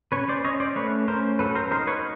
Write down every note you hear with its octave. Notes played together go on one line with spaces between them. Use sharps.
C#4 B4 C#5
C5 D5
C#4 C#5 D#5
C5 D5
A3 B4 C#5
C#4 A#4 C5
F#3 A4 B4
A#4 C5
D#4 A#4 C5
B4 C#5